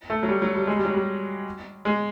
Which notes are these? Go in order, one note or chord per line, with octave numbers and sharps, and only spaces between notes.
A3
F#3
G3
F#3
G3
G#3
G3
F#3
G3
G#3